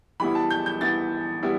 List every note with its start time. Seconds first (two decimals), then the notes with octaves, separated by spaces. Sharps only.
0.20 E3 G3 B3 E4 B5
0.35 A5
0.50 G6
0.66 G6
0.81 E3 G3 B3 E4 A6
1.43 G3 B3 E4